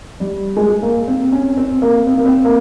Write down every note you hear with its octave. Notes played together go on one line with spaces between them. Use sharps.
G3
G#3
A#3
C4
C#4
C4
A#3
C4
A#3
C4
A#3